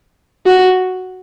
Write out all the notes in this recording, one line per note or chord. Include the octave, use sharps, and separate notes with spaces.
F#4